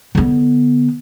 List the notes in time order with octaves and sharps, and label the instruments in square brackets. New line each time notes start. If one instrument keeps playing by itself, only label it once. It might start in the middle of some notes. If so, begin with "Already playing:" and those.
[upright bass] D3 B3